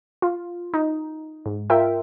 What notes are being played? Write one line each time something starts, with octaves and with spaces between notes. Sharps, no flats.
F4
D#4
G#2
F4 A#4 E5 G5